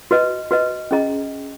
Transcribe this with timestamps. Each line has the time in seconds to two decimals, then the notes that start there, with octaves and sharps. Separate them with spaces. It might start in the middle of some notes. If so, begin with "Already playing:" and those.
0.11 F#4 B4 D#5
0.51 F#4 B4 D#5
0.91 C#4 G#4 D#5 A#5